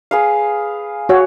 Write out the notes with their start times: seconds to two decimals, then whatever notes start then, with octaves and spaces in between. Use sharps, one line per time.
0.11 G#4 B4 F5
1.09 F#4 C#5